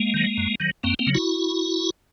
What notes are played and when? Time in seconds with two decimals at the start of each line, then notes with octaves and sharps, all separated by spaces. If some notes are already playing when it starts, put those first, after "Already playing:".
Already playing: G#3 A#3
0.14 D#3 F#3
0.38 F#2
0.60 D#3 F#3
0.83 F#2 A#3 C4
0.99 A#3 C4
1.07 C#3 F#3
1.15 E4 F#4